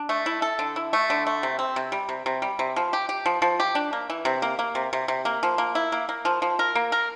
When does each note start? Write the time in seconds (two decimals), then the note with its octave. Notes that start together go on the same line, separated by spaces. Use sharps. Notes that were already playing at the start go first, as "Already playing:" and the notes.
Already playing: D4
0.09 A3
0.26 E4
0.42 A4
0.59 D3
0.76 E4
0.93 A3
1.10 D3
1.27 A3
1.43 C3
1.59 C4
1.76 C3
1.92 G3
2.09 C3
2.26 C3
2.42 G3
2.59 C3
2.76 F3
2.93 G4
3.09 G4
3.26 F3
3.42 F3
3.60 G4
3.75 D4
3.93 A#3
4.10 E3
4.25 C3
4.42 A#3
4.59 A#3
4.75 C3
4.93 C3
5.08 C3
5.25 A#3
5.43 F3
5.58 A#3
5.75 E4
5.92 A#3
6.09 A#3
6.25 F3
6.42 F3
6.59 A#4
6.75 A#3
6.92 A#4